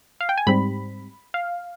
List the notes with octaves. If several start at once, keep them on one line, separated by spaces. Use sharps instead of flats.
F5
G5
G#5
G#2 G3 C4 B5
F5